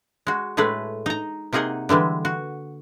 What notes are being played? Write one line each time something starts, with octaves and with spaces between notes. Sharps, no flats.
G#3 F#4
A2 G#3 A3 G#4 B4
D#4 A#5
C3 A#3 D#4 G#4 D#5 F#5
D3 E3 G3 G#3
F#4